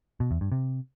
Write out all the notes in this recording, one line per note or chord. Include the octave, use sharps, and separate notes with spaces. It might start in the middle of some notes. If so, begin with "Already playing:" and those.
B2
E2
G2
C3